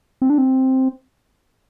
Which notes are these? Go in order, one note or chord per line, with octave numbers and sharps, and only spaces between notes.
C4
D4
C4